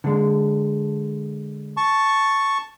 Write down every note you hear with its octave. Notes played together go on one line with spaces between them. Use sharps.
D3 G#3
A5 C#6